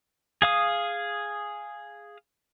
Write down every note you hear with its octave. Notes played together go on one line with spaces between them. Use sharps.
G#4 F5 D#6